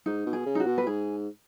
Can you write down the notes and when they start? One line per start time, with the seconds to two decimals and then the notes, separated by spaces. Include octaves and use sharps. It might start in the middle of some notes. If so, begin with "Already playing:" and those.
0.06 G#2 D#4
0.26 B2
0.33 G#4
0.46 C#3
0.55 D#4
0.60 F#4
0.66 B2
0.78 B4
0.86 G#2 G#4